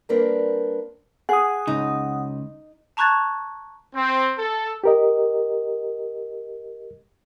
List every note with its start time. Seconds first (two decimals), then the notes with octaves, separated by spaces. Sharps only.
0.09 G3 A#3 C4 D4 A#4 B4
1.29 G#4 F#5 D#6
1.67 C#2 D#4
2.97 A5 A#5 C#6 F#6 G#6 A6
3.95 C4
4.38 A4
4.84 G4 A#4 D#5